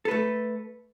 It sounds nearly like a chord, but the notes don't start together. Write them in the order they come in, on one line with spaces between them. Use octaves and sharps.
A4 B4 A3